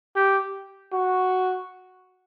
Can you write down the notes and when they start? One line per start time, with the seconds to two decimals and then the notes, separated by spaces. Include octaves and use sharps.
0.15 G4
0.92 F#4